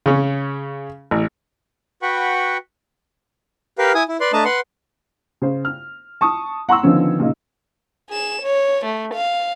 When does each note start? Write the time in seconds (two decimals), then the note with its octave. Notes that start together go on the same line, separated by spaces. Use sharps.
0.06 C#3 C#4
1.11 A1
2.02 F#4 B4 F#5 G5 B5 C#6
3.78 G4 A#4 B4 F5
3.95 E4 G#5 D#6
4.09 E4
4.20 B4 D5 C6
4.33 A3 D4 D#5 A5 A#5
4.45 B4 F#5 C6
5.42 C#3 C5
5.65 F6
6.21 A5 C#6 D#6
6.69 F#5 A#5 C6 C#6 E6
6.83 D3 D#3 F3 B3 C#4
7.19 A#2 C#3 D#4
8.09 G#4 E7
8.42 C#5
8.85 A3
9.14 F5